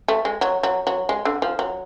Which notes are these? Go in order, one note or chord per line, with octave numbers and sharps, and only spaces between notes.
A3
G#3
F#3
F#3
F#3
G#3
D3
F3
F#3